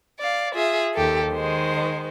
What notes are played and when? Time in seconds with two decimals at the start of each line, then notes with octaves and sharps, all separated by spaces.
0.19 D5 F5
0.54 F4 G#4 E5
0.94 D#2 G4 A4
1.32 D#3 G#3 C5